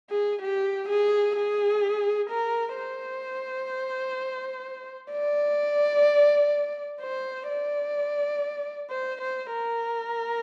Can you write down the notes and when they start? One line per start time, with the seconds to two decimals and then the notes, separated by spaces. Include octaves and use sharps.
0.10 G#4
0.42 G4
0.89 G#4
1.36 G#4
2.30 A#4
2.77 C5
5.12 D5
7.02 C5
7.49 D5
8.90 C5
9.21 C5
9.53 A#4